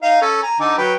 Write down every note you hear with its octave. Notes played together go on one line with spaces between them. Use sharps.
D#4 F5
C#4 A4
G#5 A#5
D3 D#4 D6
F#3 B4 G5